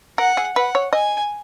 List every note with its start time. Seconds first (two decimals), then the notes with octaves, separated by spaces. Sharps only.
0.18 A#4 F#5
0.37 G#4
0.56 B4 F#5
0.75 C#5
0.93 D#5 G#5